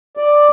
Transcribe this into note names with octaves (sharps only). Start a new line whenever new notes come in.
D5